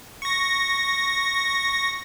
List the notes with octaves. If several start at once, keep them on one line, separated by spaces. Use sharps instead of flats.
C#6 A#6